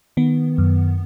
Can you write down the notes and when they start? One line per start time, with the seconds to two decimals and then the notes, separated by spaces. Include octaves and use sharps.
0.17 D#3 B3
0.58 F#2